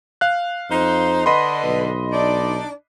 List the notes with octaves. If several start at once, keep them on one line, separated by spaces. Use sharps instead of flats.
F5 F#6
F2 D#4 C5
D3 B4 D#5 B5 C6
B1
D4 D#4 D5